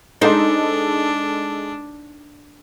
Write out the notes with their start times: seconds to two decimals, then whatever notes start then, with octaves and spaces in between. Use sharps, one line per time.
0.21 G#3 D4 D#4 A4 C5 D#5